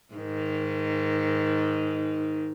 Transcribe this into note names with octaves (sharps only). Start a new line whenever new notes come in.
G#2 D#3